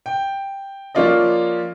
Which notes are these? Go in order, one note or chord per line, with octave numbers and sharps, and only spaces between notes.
G5
F3 A#3 C#4 F4 D5 D#5